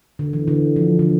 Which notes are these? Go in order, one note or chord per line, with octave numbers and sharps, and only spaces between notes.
D3
E3
D3
F3
D3